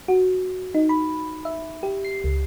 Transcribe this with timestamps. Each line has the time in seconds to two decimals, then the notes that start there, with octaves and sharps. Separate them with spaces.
0.08 F#4
0.74 D#4
0.89 B5
1.45 E5
1.83 G4
2.05 C7
2.24 C#2